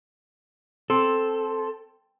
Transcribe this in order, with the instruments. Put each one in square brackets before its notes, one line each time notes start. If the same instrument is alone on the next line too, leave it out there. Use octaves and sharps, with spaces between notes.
[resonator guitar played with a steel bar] C4 [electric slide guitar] A4